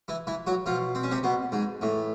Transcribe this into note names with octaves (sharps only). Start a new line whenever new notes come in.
E3 E4
E3 E4
F#3 F#4
B2 F3 F4
C4
C#4
C3 C4
B2 B3
G#2 G#3
A2 E3